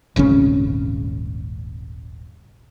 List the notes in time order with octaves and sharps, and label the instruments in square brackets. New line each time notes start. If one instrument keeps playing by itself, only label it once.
[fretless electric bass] D#1 G#1 C#3 C#4